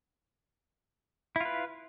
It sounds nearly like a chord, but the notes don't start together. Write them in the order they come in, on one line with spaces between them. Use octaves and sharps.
E4 F4 B4